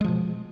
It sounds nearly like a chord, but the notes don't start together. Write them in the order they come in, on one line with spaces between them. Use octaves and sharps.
G#3 F3 B2